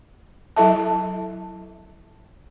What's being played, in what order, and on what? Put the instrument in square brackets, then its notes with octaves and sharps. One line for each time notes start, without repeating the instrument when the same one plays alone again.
[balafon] F#3 E4 A4 E5 A5